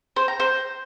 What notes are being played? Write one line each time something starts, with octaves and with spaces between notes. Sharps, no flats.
C5
A#5
C5